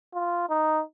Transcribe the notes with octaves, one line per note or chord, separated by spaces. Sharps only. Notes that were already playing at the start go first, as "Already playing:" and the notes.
F4
D#4